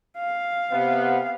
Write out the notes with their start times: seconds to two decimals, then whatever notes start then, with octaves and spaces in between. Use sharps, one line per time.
0.18 F5
0.72 C3 B3